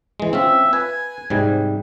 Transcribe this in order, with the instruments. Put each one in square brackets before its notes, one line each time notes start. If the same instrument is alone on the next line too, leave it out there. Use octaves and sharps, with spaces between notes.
[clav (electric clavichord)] E3 G#3
[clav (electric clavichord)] C4 C#4 F4 [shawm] E5
[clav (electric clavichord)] B4 [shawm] G#5
[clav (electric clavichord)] G#2 C3 G3